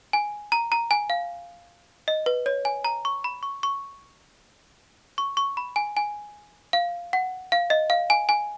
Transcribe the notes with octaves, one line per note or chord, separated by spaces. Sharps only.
G#5
A#5
A#5
G#5
F5
D#5
B4
C#5
G#5
A#5
C#6
B5
C#6
C#6
C#6
C#6
B5
G#5
G#5
F5
F#5
F5
D#5
F5
G#5
G#5